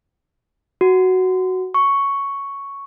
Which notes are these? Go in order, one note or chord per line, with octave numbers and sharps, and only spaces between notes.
F#4
C#6